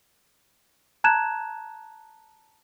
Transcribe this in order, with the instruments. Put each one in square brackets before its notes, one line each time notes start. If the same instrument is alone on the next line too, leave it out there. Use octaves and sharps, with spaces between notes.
[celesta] A5 A#5 F#6 G#6 E7